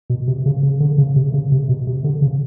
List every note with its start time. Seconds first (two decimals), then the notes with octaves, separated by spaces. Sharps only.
0.10 B2
0.28 C3
0.46 C#3
0.63 C#3
0.80 D3
0.98 C#3
1.16 C3
1.34 C#3
1.52 C3
1.69 B2
1.87 C3
2.04 D3
2.22 C#3